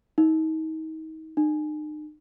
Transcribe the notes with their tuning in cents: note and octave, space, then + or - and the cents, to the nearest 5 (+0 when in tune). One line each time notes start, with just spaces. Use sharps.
D#4 +35
D#4 -40